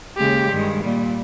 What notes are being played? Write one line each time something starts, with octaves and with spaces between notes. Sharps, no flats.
D#2 C#3 G#3 G4
G2 D#3 G#3
A#2 G3